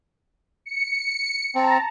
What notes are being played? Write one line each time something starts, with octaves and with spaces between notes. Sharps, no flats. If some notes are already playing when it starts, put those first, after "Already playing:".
C#7
C4 A5 A#5